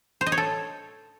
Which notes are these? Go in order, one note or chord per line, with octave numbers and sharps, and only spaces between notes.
C5
D#5
C#5
A4